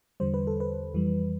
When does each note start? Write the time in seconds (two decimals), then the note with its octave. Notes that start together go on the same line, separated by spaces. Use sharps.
0.20 E2 D3 G3 C5
0.34 B4
0.47 A4
0.60 B4
0.94 F2 E3 G3